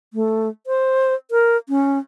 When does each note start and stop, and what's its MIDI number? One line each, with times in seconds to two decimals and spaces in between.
0.14 0.48 57
0.67 1.15 72
1.31 1.57 70
1.69 1.99 61